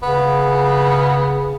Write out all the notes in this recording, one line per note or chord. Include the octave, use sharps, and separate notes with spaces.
C#3 B3